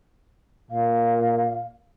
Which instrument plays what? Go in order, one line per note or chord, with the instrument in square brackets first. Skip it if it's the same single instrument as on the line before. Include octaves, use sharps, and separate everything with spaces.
[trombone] A#2 [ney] F5